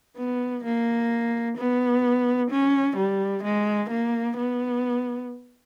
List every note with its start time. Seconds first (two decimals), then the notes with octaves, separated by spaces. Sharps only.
0.17 B3
0.64 A#3
1.58 B3
2.51 C#4
2.97 G3
3.44 G#3
3.90 A#3
4.37 B3